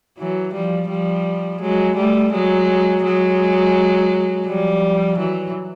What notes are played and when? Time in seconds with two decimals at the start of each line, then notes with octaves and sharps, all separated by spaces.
0.18 E3 F#3
0.54 F3 G3
0.89 F3 G3
1.61 F#3 G#3
1.96 G3 A3
2.33 F#3 G#3
3.04 F#3 G#3
4.47 F3 G3
5.18 E3 F#3